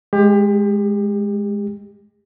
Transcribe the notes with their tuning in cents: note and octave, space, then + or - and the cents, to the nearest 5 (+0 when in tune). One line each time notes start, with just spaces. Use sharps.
G#3 +0 G4 +30